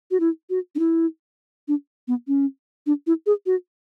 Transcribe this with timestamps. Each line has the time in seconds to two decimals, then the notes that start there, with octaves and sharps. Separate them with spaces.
0.11 F#4
0.20 E4
0.50 F#4
0.75 D4
0.79 E4
1.68 D4
2.08 B3
2.28 C#4
2.86 D4
3.07 E4
3.26 G#4
3.46 F#4